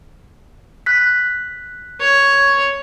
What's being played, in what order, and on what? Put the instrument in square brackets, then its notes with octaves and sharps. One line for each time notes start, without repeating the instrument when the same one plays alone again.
[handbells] F#6 B6
[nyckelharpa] C#5